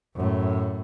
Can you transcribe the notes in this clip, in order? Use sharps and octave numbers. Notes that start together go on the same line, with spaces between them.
F#2 A2